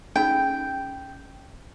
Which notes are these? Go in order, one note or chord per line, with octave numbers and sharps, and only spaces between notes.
C#4 D#4 G#4 G5